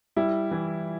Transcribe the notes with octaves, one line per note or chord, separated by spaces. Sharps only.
G3 E4
E3